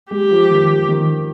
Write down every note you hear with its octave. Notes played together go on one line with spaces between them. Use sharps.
G#3 G4
F3
D#3
D#3